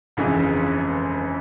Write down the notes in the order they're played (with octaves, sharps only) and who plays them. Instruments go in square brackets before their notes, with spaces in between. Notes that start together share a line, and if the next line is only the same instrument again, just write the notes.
[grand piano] G1 F2 C#3 E3 G#3